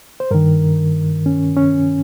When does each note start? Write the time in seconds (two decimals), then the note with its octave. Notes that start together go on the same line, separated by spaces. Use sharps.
0.20 C5
0.31 G2 D#3 A#4
1.26 C#4
1.57 C#4